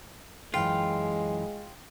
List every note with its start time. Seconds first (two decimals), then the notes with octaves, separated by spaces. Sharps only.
0.54 F#2 E3 G#3 F4 G5